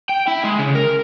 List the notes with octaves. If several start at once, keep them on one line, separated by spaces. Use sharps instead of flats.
G5
E4
G#3
C#3
A#4